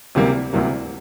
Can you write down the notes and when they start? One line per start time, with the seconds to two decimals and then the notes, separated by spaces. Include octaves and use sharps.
0.15 D2 C3 E3 G3 A#3
0.53 D2 C3 E3 G3 A#3